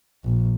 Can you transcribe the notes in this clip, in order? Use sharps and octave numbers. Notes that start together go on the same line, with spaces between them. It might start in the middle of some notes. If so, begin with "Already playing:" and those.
A#1